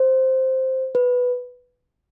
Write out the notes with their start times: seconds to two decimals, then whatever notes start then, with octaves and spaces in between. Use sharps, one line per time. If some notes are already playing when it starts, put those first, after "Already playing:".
Already playing: C5
0.95 B4